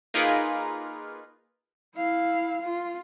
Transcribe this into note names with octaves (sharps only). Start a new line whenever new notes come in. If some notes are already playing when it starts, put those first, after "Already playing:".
A#3 D#4 F4 G#4 A#4 B4
E4 F5
F4